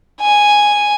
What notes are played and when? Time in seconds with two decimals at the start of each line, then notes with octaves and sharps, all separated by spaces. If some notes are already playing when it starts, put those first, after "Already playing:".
0.21 G#5